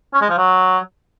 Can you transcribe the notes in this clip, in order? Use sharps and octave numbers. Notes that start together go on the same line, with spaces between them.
C#4
G#3
F3
F#3